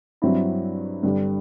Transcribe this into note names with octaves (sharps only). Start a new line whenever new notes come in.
G2 F#3 C4 E4
G2 D3 G3 D4